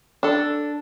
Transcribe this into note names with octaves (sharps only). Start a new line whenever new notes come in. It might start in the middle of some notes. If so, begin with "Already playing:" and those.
D4 A4